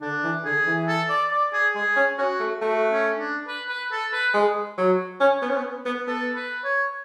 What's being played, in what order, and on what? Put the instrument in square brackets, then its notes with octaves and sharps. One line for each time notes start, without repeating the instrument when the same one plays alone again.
[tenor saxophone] D3 [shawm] D4
[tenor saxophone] E3
[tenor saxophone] D3 [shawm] G#4
[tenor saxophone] E3
[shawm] A4
D5
D5
G#4
[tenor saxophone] G#3 [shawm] G#4
[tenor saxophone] C#4
[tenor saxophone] C#4 [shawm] F#4
[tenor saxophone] A3
[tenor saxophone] A3 [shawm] F#4
[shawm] C#4
D4
B4
B4
A4
B4
[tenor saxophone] G#3
F#3
C#4
B3
C#4
B3
B3
[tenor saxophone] B3 [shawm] A4
[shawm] B4
C#5